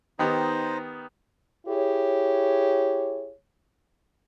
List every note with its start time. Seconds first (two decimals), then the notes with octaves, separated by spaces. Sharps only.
0.19 D#3 B3 D#4 G4 C5 D#5
1.67 E4 G4 G#4 C#5